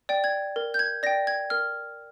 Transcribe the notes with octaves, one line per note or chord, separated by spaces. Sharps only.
D5 G5
G#6
A#4
G6
G#6
D5 G5 A#6
G#6
A#4 F6